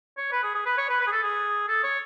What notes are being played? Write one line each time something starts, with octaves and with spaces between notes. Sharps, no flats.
C#5
B4
G#4
G#4
B4
C#5
B4
B4
G#4
A4
G#4
A4
C#5